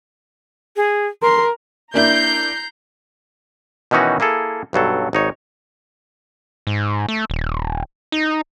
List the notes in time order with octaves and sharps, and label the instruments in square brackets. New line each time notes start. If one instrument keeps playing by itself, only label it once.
[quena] G#4
[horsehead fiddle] A#4 [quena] C6
[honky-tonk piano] A#3 D4 E4 [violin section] A#5 G6 C7
[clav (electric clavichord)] B2 D#3 E3 C#4 D#4 F#4
A#3 E4 G#4 A4
B1 G2 F#3 A4
G#1 D#4 C#5
[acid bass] G#2
A3
D#1
D#4